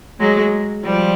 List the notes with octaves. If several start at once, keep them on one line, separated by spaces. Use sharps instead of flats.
F#3 G#3
F3 G3